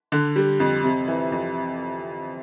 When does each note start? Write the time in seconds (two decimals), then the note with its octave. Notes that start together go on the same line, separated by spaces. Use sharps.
0.12 D3
0.36 G3
0.60 F2
0.84 C3
1.08 E3
1.32 F2